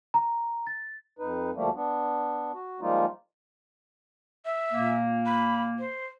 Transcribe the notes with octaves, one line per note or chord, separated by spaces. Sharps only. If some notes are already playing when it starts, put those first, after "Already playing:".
A#5
A6
F2 D#4 B4
D2 F3 G3 A3 A#3
B3 D4
F#4
F3 G3 G#3 A#3 D#4 F4
E5
A#2 A#3
B5
C5